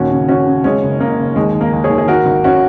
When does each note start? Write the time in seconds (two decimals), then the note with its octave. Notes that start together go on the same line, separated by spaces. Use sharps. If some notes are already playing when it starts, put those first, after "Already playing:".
Already playing: D#2 A#2 C#4 F#4
0.11 C#3
0.28 C#3 C#4 F#4
0.47 C#3
0.64 C#3 G#3 C#4
0.83 F#1
1.00 C#3 A#3
1.18 F#1
1.36 D#2 G#3
1.55 D#2
1.61 A#3
1.73 D#2
1.84 G#4 C#5
1.90 D#2
1.98 G#4
2.08 G#1 F#4 A#4
2.26 G#1
2.44 C#4 F#4